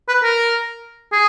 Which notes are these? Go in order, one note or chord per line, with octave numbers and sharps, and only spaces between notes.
B4
A#4
G#4